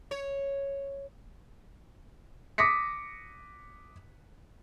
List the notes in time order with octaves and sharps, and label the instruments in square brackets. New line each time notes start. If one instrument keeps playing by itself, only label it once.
[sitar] C#5
[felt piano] D6 D#6 A#6 B6 C#7